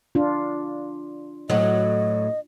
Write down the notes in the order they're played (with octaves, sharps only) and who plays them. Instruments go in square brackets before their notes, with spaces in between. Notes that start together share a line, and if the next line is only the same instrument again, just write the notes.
[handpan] D4 F4
[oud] A2 F#3 [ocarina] D#5